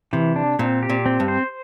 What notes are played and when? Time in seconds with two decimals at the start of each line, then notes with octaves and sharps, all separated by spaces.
0.13 C3 E3
0.36 D4
0.59 A#2 C4
0.83 G4
0.90 A#2
1.06 C4
1.20 G2
1.28 C5